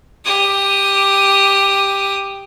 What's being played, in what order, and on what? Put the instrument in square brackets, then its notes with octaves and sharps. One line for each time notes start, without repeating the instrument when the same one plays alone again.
[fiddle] G4 D#6